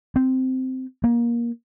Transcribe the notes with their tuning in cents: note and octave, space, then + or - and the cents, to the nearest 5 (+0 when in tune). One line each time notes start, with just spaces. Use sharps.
C4 -10
A#3 +20